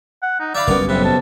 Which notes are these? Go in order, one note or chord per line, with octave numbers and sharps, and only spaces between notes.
F#5
D#4
D5 E5 F5 B5
F#1 G3 B3 C#4 A#4
B1 C3 B4
A5